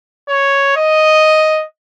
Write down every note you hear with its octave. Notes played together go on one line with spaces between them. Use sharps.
C#5
D#5